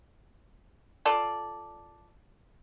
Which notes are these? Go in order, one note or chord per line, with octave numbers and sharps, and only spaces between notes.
F4 A4 D5